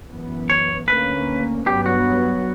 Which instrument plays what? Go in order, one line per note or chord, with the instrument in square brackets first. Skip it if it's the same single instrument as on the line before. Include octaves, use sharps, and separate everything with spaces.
[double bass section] F#2 E3 B3
[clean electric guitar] C#5
[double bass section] D2 D3 A#3 C#4 [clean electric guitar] B4
[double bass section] G2 F#3 B3 [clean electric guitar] G4
[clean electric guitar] F#4